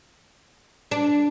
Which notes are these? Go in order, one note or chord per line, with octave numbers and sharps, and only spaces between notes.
D4